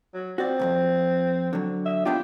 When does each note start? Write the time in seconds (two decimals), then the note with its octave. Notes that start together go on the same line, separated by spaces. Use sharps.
0.14 F#3
0.38 C4 F#4 D5
0.59 B1 F2
1.53 D3 F#3
1.85 E5
2.05 B3 D4 F4 G4